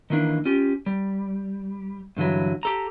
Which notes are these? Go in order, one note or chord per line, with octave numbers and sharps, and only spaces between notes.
D#3 E3 A#3 D4
C#4 F4 G4
G3
G2 D3 E3 F#3
G4 A4 A#5